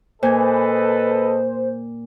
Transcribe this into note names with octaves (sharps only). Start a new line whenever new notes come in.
A#2 A4 B4 C5 D#5 G#5